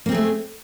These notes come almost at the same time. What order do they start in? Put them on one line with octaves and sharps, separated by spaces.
A#3 C4 G#4 A3